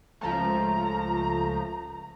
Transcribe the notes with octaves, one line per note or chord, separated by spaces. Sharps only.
C#2 F3 A3 A#5